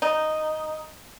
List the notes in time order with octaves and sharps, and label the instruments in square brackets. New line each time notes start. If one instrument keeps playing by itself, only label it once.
[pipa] D#4